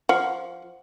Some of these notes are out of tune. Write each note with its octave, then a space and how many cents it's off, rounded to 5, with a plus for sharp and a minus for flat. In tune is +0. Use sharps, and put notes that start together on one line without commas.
F3 +0 F#5 +0